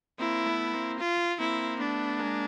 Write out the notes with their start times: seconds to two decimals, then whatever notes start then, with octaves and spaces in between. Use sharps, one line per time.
0.19 A#3 C4 E4
0.46 A3 B3
0.73 A#3 C4
0.99 F4
1.40 A#3 C4 E4
1.79 A3 B3 D4
2.19 G#3 A#3